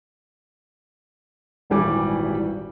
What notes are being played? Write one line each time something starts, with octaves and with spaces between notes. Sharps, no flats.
D#1 G#1 E3 G3 G#5 D6